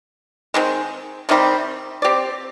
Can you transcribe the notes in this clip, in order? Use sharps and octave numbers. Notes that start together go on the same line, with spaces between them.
D#3 G#3 C4
C3 D#3 G3 C4
C4 G4 D5